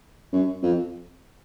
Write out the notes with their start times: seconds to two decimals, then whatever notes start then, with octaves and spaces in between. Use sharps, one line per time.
0.33 F#2
0.63 F2